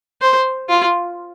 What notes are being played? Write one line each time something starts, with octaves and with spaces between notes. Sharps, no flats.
C5
F4